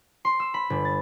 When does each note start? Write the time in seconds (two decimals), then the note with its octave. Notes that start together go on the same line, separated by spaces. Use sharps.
0.25 C6
0.40 E6
0.54 B5
0.70 G1
0.85 A6